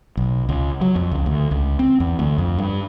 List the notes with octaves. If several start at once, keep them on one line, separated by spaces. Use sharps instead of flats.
B1
C#2
F#3
F2
C#2
D2
C#2
C4
E2
D2
F2
G2